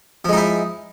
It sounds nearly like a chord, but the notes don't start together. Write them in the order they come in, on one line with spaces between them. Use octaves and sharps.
F3 G#3 D#4 E4